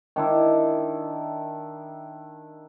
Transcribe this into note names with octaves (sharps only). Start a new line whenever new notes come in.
D#3 D4 E4